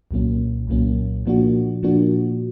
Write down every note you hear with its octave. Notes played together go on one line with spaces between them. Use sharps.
C2 A#2 F#3 A#3 C#4
C2 A#2 F#3 A#3 C#4
A#2 F3 A#3 D4 F#4
A#2 F3 A#3 D4 F#4